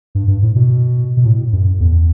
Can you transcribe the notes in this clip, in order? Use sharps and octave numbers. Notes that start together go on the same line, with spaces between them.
G2
G2
A2
B2
B2
A2
F#2
E2